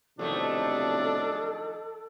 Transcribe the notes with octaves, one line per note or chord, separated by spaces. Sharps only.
B1 F2 A2 C3 D#3 A3 D4 A4